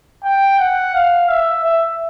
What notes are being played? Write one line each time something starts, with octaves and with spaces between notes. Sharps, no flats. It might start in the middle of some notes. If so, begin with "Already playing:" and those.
G5
F#5
F5
E5
E5